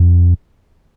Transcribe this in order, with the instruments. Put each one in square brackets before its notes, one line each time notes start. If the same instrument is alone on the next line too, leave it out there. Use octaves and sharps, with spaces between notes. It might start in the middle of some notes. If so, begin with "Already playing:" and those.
Already playing: [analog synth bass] F2